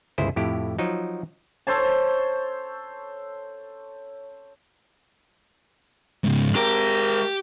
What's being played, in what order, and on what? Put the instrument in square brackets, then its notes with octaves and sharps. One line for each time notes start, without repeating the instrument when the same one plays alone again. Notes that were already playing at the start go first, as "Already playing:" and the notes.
[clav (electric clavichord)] G1 C#2 E4 G#4 C5
F2 A2 E4 G4
F3 F#3 D#4
[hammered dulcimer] A4 C5 C#5 A5
[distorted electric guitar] G#2 C#3
[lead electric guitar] G#3 A#4 [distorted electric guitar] G4